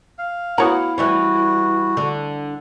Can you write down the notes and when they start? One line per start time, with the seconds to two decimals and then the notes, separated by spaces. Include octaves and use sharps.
0.18 F5
0.58 B3 E4 F#4 C#5 A#5
0.98 E3 G3 C#4 F#4
1.97 D3